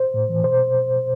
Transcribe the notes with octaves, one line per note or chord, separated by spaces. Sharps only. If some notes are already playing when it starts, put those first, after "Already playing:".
Already playing: C5
A2
E3
B2 C5